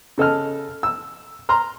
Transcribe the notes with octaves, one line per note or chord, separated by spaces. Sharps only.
C#3 A4 D#5 F6
E6
A#5 C6 F6